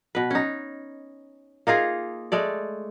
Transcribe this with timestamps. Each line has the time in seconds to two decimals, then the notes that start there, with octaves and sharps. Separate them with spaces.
0.15 B2 B4
0.31 C#4 D#4
1.67 A#3 D#4 F4 G#4
2.32 G#3 A3 D5